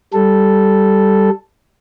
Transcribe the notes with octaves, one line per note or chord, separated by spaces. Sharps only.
G3 A4